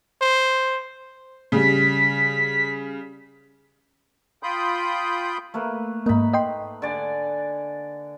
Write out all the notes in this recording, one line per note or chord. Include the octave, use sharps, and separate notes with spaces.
C5
C#3 G3 B6
F4 G5 B5 C6 D#6 G6
A3 A#3 B4
G#2 A#3 D#4 B5
D#5 G5 C6
D3 D5 G#5